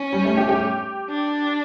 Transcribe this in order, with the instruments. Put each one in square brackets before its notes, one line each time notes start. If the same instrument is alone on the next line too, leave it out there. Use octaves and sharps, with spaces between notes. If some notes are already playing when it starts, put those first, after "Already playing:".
Already playing: [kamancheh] C#4
[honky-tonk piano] G3
A3
G4
G4
[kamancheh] D4